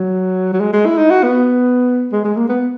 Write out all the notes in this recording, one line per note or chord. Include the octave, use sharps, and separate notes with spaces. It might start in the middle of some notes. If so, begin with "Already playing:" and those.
Already playing: F#3
F#3
G#3
G#3
E4
D#4
F#4
B3
G#3
G#3
A#3
B3